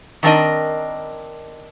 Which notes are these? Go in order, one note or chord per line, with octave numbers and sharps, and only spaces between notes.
D#3 C4 D4 A#4 D#5